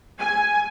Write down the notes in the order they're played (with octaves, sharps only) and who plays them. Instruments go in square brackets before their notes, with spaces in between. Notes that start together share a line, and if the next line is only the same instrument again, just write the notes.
[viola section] G#5